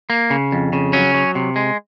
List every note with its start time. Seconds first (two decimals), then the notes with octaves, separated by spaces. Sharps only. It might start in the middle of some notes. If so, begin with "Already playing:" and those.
0.10 A#3
0.30 C#3
0.52 F2
0.73 C#3
0.93 F#3 C#4
1.14 F#3
1.35 C3
1.56 G#3